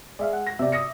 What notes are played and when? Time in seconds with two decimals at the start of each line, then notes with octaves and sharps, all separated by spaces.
0.19 G#3 D5 E5 F5
0.33 F#5
0.47 A#6
0.59 C3 D5 E5
0.72 D#6 A#6 C#7